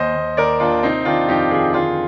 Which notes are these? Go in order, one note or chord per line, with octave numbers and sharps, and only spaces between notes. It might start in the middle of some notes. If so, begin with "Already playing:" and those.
Already playing: D#2 C5 D#5
D#2
D#2 A#4 D5
D#2 D4 F4
C3 C4 D#4
D#3 D4 F4
F2 D#4 G4
D#3 F4 G#4
D3 F4 G#4